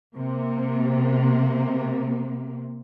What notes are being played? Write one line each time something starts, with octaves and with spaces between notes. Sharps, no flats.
C3 A#3